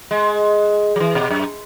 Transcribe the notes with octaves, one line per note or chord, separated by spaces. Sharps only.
G#3
F#3
E3
B2
F#2